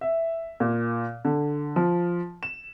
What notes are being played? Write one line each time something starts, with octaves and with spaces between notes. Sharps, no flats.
E5
A#2
D3
F3
E7